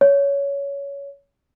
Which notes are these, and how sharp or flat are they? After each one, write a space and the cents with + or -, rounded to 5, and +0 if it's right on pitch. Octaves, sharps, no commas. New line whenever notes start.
C#5 +15